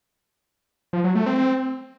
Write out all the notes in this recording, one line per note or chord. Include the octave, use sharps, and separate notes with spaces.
F3
F#3
A3
C4